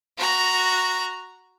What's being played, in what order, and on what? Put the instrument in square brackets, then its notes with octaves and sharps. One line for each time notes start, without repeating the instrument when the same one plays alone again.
[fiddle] F#4 A#5